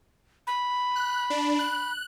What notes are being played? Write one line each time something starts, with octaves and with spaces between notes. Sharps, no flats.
B5
F#6
D4
F#6